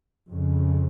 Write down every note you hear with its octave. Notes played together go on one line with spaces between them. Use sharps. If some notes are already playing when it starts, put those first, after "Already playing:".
F2 C#3